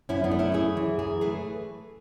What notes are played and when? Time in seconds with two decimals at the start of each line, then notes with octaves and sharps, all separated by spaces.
0.09 F#2 C#4 E4
0.24 B3 D4
0.31 A3
0.39 C#4 E4
0.54 F#2 E4 G#4
0.77 E3
0.99 F#2 E4 G#4
1.21 A3 G#4 B4